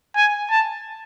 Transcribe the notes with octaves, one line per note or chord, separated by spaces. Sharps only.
G#5
A5